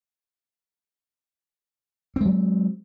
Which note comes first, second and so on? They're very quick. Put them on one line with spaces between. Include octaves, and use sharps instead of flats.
C4 G#3 F#3